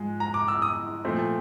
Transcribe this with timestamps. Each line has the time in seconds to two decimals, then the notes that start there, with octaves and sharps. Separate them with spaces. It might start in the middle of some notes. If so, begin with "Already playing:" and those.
Already playing: G#2 F3 G#3
0.20 A#5
0.34 D6
0.48 E6
0.62 D#6
1.05 A#2 F3 A3 C4